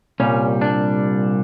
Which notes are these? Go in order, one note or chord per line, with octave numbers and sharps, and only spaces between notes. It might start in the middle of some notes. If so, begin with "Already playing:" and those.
C2 A#2 G3 C#4
D4